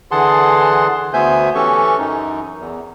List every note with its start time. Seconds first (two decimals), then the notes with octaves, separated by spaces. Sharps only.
0.11 D3 E3 G#4 F#5 A5 C6
1.13 D2 B3 C5 E5 G#5 G6
1.55 E3 C#4 G4 A4 C#6
1.99 F#2 D#4
2.59 E2